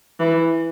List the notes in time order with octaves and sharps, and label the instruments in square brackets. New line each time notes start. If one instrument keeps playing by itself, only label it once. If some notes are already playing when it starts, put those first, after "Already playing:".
[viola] E3